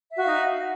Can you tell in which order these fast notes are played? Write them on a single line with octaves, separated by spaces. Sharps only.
E5 F#4 F5 D#4